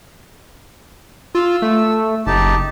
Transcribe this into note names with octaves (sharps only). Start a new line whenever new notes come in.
F4 E6
A3
F#1 D#4 G4 A5